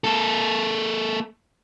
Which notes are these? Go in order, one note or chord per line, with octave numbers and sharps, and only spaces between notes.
A#3 A4